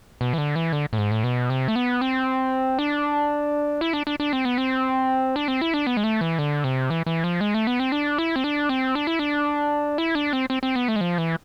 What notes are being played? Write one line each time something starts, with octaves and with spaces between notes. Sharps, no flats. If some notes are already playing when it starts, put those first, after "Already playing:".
B2
E3
D3
E3
D3
A2
G#2
A2
B2
C3
A3
B3
C4
D4
E4
D4
D4
D4
C4
B3
C4
D4
C4
E4
D4
B3
G#3
A3
E3
D3
C3
E3
E3
F3
G#3
A3
B3
C4
D4
E4
C4
D4
C4
D4
E4
D4
E4
D4
C4
C4
C4
B3
A3
G#3
F3
E3